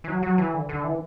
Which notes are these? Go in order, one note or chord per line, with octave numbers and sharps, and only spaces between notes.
E3
F#3
F#3
E3
D3
D3
E3